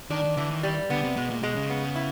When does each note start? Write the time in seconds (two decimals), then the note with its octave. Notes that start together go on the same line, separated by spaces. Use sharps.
0.11 D#3 D4
0.24 D#3
0.37 D3 E3
0.51 D#3
0.63 D#3 G3
0.90 D3 B3
1.04 C3
1.17 B2 G#3
1.30 A#2
1.43 B2 G#3
1.56 C#3
1.70 B3
1.95 E4